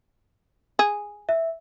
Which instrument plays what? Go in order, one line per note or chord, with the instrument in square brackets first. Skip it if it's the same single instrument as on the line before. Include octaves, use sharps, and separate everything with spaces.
[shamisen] G#4
[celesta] E5